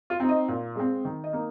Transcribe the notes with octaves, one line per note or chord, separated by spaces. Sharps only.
F4
C4 D#4
D#5
A#2
G#3 C4
D#3
D#5
A#3 D#4